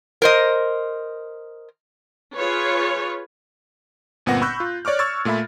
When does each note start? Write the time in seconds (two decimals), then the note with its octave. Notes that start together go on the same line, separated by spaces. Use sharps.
0.22 A#4 C5 D#5
2.36 F4 G#4 B4 C#5
4.26 G1 A#2 B3 C4 F#5 A#6
4.42 B5 C#6 E6 F#6 G6
4.60 F4
4.85 C#5 D5 C#6 D6 F6
4.99 C#6 E6 F6 G#6 A6
5.25 A#2 A3 F4 E5 B5